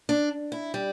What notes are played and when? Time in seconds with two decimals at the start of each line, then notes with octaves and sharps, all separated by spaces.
0.09 D4
0.52 E4
0.74 G3